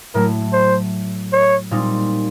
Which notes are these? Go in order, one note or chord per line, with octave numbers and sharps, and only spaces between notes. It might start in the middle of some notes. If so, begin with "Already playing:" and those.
A2 F#3 A3 A#4
C5
C#5
A#2 G3 C4 D#4